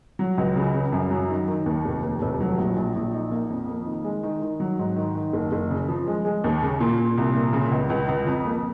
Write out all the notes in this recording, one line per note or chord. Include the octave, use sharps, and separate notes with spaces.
F#3
C#2
C#3
C#3
F#2
F#3
D#3
D#3
D#2
F1
D#2
F1
F#3
A#1
A#1
A#1
D#4
A#3
F2
A#3
D#3
G#3
D#3
D#3
F#3
G#2
D#3
D#3
F#1
F#1
C#3
F3
G#3
G#3
D#2
C#3
A#2
A#2
C2
A#2
C#3
C#2
C#2
C#2
F2
A#3